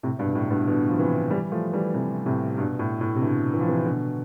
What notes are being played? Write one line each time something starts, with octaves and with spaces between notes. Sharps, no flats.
A2 C3
G2 B2
A2
G2 B2
B2 D3
F3
C3 E3
E3 G3
F3 A3
E3 G3
C3 E3
A2 C3
G2 B2
A2
A2
C3
B2 D3
E3
F3
C3 E3
B2 D3